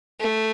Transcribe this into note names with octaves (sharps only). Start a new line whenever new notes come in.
A3